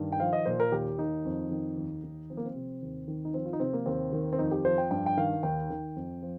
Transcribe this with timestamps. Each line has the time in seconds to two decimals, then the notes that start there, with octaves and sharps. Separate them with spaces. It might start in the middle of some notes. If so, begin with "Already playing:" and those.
Already playing: G2 D#3
0.12 G5
0.19 F3 F5
0.33 D#5
0.46 A#2 C5
0.60 A#4
0.72 D#2 G4
0.98 D#3 D#4
1.25 F2
1.51 D#3
1.77 D#2
2.04 D#3
2.30 F3 C4
2.37 A#3
2.45 C4
2.55 C3
2.82 D#2
3.08 D#3
3.25 D#4
3.34 F3 C4
3.46 F4
3.53 D#4
3.60 C3 C4
3.73 A#3
3.86 D#2 C4
4.13 D#3
4.33 C4
4.39 F2 D#4
4.51 G4
4.65 F3 C5
4.78 G5
4.91 G2 G5
5.06 G5
5.17 D#3 F5
5.43 D#2 G5
5.70 D#3
5.96 F2
6.22 F3